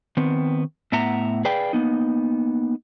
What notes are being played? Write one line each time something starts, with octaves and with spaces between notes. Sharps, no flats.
D#3 B3 C4
A2 B3 E5 F#5 A#5
G#4 B4 D5 F5 G5
A#3 B3 D#4